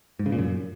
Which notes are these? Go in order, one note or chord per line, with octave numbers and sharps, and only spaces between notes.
G#2
C#3
A#2
F#2